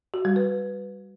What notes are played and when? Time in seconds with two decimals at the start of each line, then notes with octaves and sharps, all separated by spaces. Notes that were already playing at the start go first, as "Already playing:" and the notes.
0.14 F#4
0.25 G3
0.36 B4